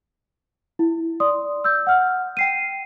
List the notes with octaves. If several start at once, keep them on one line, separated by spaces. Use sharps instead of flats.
E4
D5 C6 D#6
E6 G6
F#5 F6
G5 C7 D#7